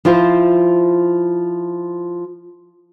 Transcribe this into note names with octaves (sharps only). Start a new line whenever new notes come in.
F3 E4 F4 C5